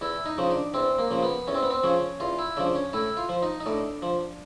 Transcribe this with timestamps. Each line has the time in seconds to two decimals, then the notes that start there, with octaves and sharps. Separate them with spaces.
0.01 E2 E4
0.26 D#4
0.38 C#3 F3
0.51 D4
0.74 E2 C4
0.98 A#3
1.11 C#3 F3
1.23 B3
1.48 E2 C#4
1.55 C4
1.63 B3
1.70 C4
1.83 C#3 F3 C#4
2.20 E2 F4
2.39 E4
2.57 C#3 F3 D4
2.75 C#4
2.93 A2 E4
3.17 F4
3.29 F3
3.42 D#4
3.60 D#4
3.66 A2 D4
4.02 F3